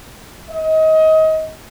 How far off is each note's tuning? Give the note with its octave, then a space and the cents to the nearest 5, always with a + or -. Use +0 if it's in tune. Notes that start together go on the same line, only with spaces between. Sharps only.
D#5 +25